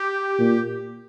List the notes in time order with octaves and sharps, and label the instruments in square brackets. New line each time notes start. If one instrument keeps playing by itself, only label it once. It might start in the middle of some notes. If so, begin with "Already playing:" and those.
Already playing: [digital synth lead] G4
[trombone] A#2